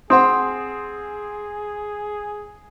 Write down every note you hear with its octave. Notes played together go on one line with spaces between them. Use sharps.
C4 G#4 F#5 C6 D#6